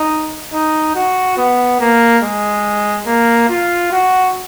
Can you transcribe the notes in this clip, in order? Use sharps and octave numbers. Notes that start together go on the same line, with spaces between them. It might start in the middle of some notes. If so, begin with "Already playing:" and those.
Already playing: D#4
D#4
F#4
B3
A#3
G#3
A#3
F4
F#4